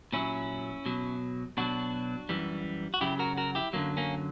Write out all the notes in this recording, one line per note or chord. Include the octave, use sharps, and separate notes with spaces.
A#2 F#3 C#4 E4
B2 F#3
B2 F#3 D4 F#4
F#2 E3 G3
F#4
F#2 C#3 F#3 E4 G4
F#4 A#4
F#4 A#4
E4 G4
F#2 D3 F#3 A#3
A#3 C#4